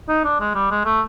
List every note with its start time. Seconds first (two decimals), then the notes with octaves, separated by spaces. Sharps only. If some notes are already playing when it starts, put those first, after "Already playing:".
0.09 D#4
0.24 D4
0.40 G#3
0.55 G3
0.71 G#3
0.85 A3